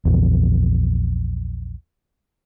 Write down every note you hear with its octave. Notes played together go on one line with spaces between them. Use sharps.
A#1 E2